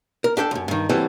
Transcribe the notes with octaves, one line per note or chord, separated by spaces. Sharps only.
A#4
D4 G4 A4 G5
C#2 F#2
G2 D#3
E3 F#3 G3 C4 A4